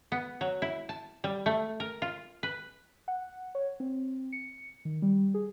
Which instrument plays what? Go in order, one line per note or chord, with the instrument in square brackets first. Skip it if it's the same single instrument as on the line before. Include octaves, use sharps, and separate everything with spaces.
[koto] B3
F#3
E4
A5
G3
A3
A#4
F4
B4
[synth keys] F#5
C#5
C4
C#7
D#3
G3
G#4